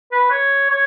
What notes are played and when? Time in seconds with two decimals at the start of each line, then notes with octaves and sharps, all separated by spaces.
0.12 B4
0.31 C#5
0.70 C#5